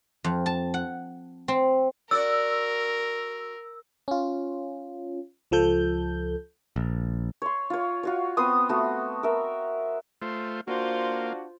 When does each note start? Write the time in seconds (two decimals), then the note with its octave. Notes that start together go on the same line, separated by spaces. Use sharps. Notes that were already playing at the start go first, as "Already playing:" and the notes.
0.24 F2
0.46 A5
0.74 F#5
1.48 C4
2.11 F#4 A#4 D5 E6
4.08 C#4 F4
5.51 C#2 F3 A4 G6
6.76 A#1
7.42 C#5 C6
7.70 F4 C#5
8.03 F4 F#4 C#5
8.37 B3 C4 C6 D#6
8.69 A3 F#4
9.23 A#4 E5
10.22 A3 F4 C5
10.68 A#3 D4 F4 F#4 C5